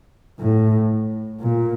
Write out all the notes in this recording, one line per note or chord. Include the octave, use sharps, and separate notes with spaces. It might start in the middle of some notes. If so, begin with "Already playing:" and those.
A2
A#2